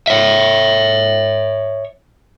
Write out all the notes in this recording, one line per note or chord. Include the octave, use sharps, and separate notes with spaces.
C#5 E5